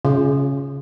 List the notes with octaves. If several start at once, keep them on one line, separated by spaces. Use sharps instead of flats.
C#3